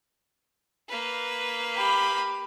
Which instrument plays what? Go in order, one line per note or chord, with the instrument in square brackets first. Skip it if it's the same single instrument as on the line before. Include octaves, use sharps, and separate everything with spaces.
[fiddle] A#3 B4
[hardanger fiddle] G4 B5